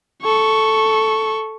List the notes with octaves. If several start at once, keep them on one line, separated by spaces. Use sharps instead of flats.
A4 C#6